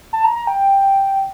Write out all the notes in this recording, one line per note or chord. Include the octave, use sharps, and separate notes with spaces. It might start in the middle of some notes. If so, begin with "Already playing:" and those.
A5
A#5
A#5
G5